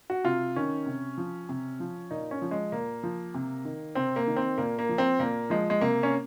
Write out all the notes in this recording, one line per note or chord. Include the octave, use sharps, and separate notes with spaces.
F#4
C3 F4
D#3 C#4
C3
F3
C3
F3
A#2 D#4
C#4
F3
G#3
A#2 A#3
F3
C3
D#3
C3 C4
A#3
D#3
C4
A#2 A#3
A#3
F3
C4
A#2 A#3
F3 G#3
G#3
C3 A#3
C#4